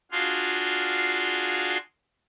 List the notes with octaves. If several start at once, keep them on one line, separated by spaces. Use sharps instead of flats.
D4 F4 F#4 G#4 F5 C6